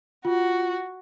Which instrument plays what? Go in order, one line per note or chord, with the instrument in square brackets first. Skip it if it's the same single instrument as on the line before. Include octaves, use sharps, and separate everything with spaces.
[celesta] F4 [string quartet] F#4